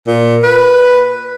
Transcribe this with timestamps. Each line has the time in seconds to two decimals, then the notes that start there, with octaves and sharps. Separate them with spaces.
0.07 A#2
0.44 B4